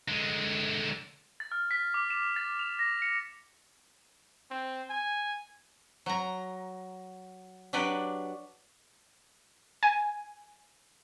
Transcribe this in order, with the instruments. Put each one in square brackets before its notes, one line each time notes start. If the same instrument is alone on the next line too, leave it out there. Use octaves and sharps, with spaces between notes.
[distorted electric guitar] D3 G#3
[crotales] A6
F6
B6
D6
E7
A6
F7
A#6
C#7
[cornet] C4
G#5
[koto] F#3 A#5
F#3 D4 G4 B4 D5
[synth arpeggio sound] G#5